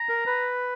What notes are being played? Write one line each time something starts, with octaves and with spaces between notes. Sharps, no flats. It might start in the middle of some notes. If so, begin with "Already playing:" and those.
Already playing: A#5
A#4
B4